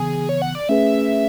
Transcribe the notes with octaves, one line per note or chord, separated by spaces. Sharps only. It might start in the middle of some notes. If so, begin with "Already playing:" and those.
Already playing: C#3 E3 B3 G#4
C#5
F#5
D5
A3 C#4 G#4 B4 E5